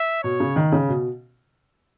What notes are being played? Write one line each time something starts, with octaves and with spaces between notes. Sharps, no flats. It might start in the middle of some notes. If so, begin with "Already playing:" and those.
Already playing: E5
B2 C#5
C#3
D#3
C#3
B2